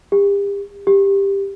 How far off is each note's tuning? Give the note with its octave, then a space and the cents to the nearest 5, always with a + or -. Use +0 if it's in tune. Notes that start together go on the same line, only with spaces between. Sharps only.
G4 +40
G4 +10